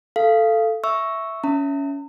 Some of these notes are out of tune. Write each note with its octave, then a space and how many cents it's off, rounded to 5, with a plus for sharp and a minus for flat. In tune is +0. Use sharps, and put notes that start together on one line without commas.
A4 +0 F5 -20
E5 +0 C#6 +0 E6 +0
C#4 +20 E5 +0 A#5 -45